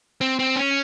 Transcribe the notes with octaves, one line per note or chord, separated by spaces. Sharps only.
C4
C4
C#4